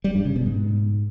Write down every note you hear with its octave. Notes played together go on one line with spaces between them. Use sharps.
G3
G2
C#3
B2
G#2